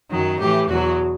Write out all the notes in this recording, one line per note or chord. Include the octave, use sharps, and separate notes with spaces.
F#2 D#3 F#3
A2 E3 G4
E2 B2 F#3 F#4